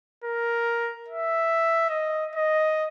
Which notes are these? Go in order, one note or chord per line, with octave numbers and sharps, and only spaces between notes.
A#4
E5
D#5
D#5